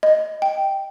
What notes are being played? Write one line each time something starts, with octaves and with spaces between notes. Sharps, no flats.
D#5
G5